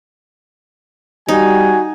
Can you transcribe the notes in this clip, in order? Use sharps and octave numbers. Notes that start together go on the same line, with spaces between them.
G3 D#4 F#4 G#5